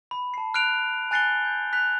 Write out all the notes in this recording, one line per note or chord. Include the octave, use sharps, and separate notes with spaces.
B5
A5 C7
F6 F#6 C7 D7 F7
G#5 F#6 A6 C7 C#7 G7
G6
F#6 B6 F7